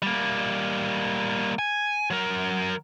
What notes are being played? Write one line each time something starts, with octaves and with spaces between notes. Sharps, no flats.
G3 A#3
G#5
F#3 A#4